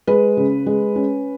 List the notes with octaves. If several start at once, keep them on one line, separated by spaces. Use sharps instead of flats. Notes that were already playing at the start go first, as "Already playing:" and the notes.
G#3 B4
C#3
G#3
C#4